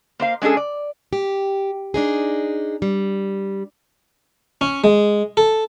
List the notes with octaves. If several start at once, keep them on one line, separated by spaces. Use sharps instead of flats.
A#3 C5 F5
G#3 C#4 D4 G#4 A4
D5
G4
D4 D#4 G#4
G3
C#4
G#3
A4